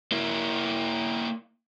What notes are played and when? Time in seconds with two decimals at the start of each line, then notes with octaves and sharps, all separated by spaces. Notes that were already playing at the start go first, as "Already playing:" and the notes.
0.12 A#3 E4